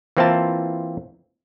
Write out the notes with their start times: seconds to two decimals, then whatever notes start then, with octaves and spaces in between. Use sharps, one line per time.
0.17 E3 A#3 C4 E4 F4 A5